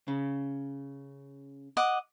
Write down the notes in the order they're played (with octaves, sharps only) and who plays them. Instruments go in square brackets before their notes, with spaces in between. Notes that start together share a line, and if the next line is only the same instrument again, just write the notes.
[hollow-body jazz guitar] C#3
[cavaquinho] D#5 F#5 D6